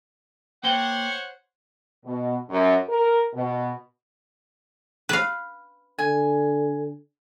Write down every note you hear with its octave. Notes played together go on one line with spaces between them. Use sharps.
A#3 C5 C#5 F#5 G5
B2
F#2
A#4
B2
B4 F5
D3 G#5